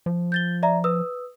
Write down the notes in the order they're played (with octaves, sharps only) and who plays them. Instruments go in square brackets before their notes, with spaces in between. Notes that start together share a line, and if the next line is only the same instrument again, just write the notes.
[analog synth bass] F3
[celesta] G6 A6 G7
D5 E5 A#5
B4 D#6 E6